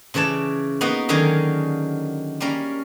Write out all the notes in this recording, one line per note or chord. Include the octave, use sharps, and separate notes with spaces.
C#3 E3 C#5 D5 A5
A#3 B3 D#4 F#4 B4 F#5
D3 D#3 F#3 C#4 G#4 A#4
G3 A#3 C#4 A#4